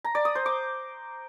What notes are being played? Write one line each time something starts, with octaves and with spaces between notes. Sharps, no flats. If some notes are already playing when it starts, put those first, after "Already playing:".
A#5
D5
D#6
C5
D6